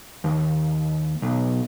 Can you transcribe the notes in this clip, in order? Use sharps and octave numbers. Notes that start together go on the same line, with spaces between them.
D#2
B1